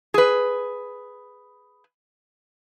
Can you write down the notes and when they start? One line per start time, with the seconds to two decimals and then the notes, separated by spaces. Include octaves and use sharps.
0.14 G#4 B4